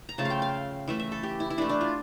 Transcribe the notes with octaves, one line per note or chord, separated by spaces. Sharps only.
A#5
C#3 F3 A3 A5
F5
G5
F5
E3 A3 E5
E5
A4
G4
E4
E4
E3 A3 D4
D4
F4